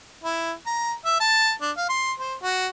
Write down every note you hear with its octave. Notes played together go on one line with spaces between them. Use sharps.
E4
A#5
E5
A5
D4
F5
C6
C5
F#4